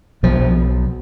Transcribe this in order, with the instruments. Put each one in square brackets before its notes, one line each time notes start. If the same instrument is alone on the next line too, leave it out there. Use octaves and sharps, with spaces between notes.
[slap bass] B1 B2 F3